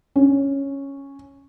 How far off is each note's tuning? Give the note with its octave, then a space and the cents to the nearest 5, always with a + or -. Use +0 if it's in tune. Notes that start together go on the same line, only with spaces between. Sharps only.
C#4 -5